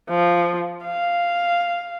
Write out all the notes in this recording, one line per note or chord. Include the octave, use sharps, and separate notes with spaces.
F3
F5